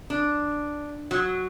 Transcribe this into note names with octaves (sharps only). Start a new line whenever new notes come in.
D4
F#3